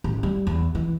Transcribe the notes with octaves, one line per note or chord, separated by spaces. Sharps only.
A1
G3
E2
E3